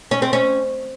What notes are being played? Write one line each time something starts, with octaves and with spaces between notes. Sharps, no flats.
C#4
C4
C#4